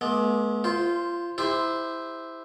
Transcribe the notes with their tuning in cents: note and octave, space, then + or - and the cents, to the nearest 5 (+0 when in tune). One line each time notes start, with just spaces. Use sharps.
G#3 +40 B3 -40
F4 -20 C5 +0
E4 -5 G4 +40 C5 -10